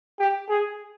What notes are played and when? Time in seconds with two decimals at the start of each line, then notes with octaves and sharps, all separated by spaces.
0.19 G4
0.49 G#4